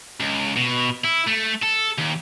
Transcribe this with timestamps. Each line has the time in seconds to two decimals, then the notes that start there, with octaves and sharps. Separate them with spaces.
0.20 C#2
0.56 B2
1.05 E4
1.28 A3
1.63 A4
1.99 D#2